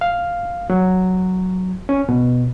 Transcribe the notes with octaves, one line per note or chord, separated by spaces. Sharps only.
F5
F#3
C#4
B2